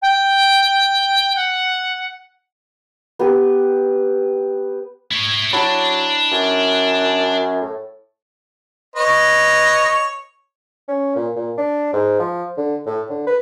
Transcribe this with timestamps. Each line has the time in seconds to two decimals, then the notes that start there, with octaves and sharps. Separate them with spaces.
0.02 G5
1.36 F#5
3.19 B3 G4 B4
5.12 E4 C#5
5.53 F#3 D4 E4 A5 B5
6.32 F#2
7.62 A2
8.96 B4 C#5 D#5
10.88 C#4
11.15 A#2
11.36 A#2
11.58 D4
11.93 G#2
12.19 F3
12.57 D3
12.86 A2
13.09 D3
13.27 B4